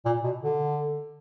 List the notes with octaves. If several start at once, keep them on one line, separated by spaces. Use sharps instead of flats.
A#2
B2
D3